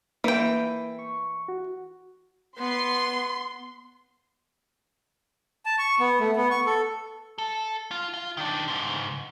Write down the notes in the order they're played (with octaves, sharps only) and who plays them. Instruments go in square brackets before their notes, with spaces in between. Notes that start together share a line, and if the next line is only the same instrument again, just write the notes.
[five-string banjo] E3 G5 [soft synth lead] A#3
[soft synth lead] C#6
F#4
[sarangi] B3 [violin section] C6
[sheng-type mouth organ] A5
C#6
B3
A3
B3
C#6
A4
[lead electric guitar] A4
F4
F4
D#3 D4
C#2 G#2